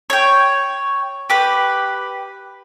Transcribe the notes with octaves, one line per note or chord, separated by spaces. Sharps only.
C#5 G5
G4 B4